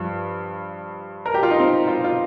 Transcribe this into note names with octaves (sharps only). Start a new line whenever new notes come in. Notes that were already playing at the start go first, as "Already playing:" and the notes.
Already playing: G2 F3
A#4
G4
F4
D#4
C4
F4
F4